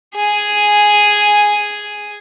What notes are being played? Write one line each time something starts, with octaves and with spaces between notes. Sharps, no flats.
G#4 G#5